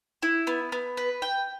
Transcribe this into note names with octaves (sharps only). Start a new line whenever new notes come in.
E4
B3
B3
B4
G5